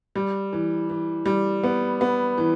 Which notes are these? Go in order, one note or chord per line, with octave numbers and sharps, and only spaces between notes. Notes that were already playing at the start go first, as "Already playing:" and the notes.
G3
E3
E3
G3
B3
B3
E3